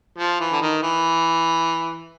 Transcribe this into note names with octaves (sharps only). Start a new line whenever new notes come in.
F3
E3
D3
D#3
E3